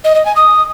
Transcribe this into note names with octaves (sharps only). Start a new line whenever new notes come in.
D#5
D#5
G#5
D#6